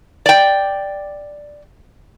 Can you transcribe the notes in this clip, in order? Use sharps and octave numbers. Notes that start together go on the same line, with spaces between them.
D5 G5